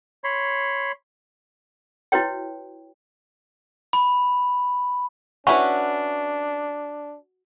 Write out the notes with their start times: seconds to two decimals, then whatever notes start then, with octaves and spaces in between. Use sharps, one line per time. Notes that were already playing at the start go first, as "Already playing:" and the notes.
0.24 C#5 B5 C6
2.12 E4 F#4 B4 C#5 G5
3.93 B5
5.47 C#4 D4 E4 F#4 B4